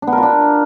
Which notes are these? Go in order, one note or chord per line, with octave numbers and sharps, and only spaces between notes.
D4
B3
A#4
F4
D4